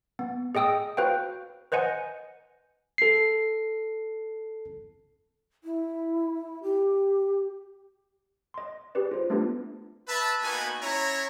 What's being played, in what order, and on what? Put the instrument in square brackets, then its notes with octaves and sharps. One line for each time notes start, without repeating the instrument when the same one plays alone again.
[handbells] B3
G#4 D#5 G5 D#6 E6
F#4 B4 C5 F5 G5
B4 C5 D#5 F#5 G#5
[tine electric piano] A4 C7
[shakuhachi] E4
G4
[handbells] D#5 C6
G4 G#4 B4 D5
F4 C5
A3 B3 D4 F4 G4 B4
[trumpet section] B4 E5 A5
A#3 B3 D#4 F#4 B4 G#5
C#4 E4 C#5 A#5